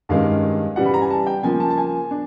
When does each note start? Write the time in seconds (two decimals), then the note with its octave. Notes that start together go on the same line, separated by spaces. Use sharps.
0.09 G2 D#3 G#3 C#4 F5
0.76 C#3 E3 G3 F#5
0.86 B5
0.94 A#5
1.01 G#5
1.10 A5
1.27 G5
1.43 C#3 F3 A#3 G#5
1.60 A5
1.70 A5
1.78 G#5
2.11 D4